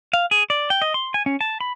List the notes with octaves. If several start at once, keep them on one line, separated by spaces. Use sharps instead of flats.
F5
G#4
D5
G5
D#5
C6
G#5
C#4
A5
B5